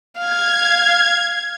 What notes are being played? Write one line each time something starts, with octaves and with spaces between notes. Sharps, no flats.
F5 G#6